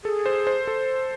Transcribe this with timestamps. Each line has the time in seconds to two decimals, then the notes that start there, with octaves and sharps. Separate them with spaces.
0.04 G#4 A4
0.26 C5
0.47 C5
0.68 A4